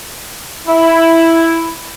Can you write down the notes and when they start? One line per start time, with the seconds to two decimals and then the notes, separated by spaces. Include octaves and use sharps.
0.68 E4